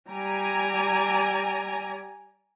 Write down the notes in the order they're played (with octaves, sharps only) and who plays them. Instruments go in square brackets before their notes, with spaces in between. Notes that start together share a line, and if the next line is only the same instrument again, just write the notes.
[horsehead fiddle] G3 D5 [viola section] G#5 A#5